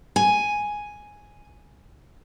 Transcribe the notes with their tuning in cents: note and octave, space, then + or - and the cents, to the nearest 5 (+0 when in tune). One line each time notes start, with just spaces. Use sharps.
G#5 +0